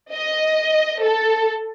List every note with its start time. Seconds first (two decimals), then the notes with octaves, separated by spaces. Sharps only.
0.12 D#5
1.03 A4